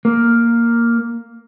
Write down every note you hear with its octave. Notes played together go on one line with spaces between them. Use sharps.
A#3